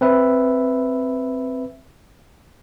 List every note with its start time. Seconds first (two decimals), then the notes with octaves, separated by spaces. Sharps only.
0.01 C4 B4 E5